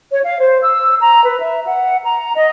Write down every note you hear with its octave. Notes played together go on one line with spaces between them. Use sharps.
C#5
F5
C5
E6
A#5
B4
E5
F#5
A#5
D#5